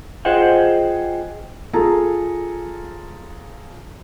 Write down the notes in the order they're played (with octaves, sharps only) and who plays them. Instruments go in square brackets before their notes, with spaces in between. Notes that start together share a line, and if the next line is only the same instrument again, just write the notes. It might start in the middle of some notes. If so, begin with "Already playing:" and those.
[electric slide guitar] F4 G#4 C5 D#5 F#5 G5
[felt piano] F4 G#4 A4 A5 A#5